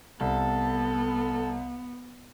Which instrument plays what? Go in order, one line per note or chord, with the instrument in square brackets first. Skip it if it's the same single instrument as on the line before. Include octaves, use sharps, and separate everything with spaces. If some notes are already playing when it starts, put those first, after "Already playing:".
[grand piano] C2 [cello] B3 [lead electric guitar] A4